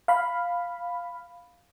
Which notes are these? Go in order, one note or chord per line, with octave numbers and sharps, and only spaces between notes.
F5 B5